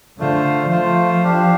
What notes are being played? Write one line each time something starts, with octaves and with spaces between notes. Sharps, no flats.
D3 A3 F4 C5
F3 A3 F4 C5
D4 G4 F5